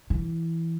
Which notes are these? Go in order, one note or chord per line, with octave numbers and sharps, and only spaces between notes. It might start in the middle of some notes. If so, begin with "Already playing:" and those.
E3